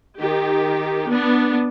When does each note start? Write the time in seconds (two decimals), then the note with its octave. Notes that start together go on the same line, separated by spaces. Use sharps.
0.18 D#3 G4
1.08 B3 D4